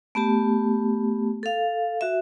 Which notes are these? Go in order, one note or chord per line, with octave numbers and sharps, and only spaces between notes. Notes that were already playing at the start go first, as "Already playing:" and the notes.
A3 B3 G4 A5
A4 F5
F#4 E5